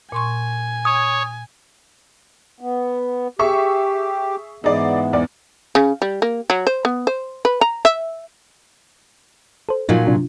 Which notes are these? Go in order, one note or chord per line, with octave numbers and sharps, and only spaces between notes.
A#2 G#5 C6 C#6
C#5 D#6
B3
G4 G#4 E5 C#6
G#2 E3 B3 D#4 G#4 D5
E2 D5
C#3
G3
A#3
F#3
C5
B3
C5
B4
A#5
E5
A4 C5
A#2 F3 F#3 D#4 F4
C3 D4 F4